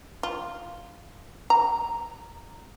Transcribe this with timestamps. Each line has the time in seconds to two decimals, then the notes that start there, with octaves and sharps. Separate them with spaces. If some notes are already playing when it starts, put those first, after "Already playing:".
0.23 F4
1.50 A#5